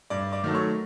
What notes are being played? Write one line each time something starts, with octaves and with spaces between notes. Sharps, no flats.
G2 D5 D6
D5 D6
D#3 F#3 A3
C#5 C#6